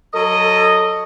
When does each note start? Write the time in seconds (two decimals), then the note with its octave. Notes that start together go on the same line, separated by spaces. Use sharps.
0.13 F#3 A4 D#5